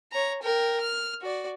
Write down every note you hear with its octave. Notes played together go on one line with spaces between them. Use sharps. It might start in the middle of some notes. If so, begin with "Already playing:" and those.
C#5 A#5
A#4 G5
F6
F#4 D5